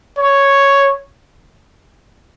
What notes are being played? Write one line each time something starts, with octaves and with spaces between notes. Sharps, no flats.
C#5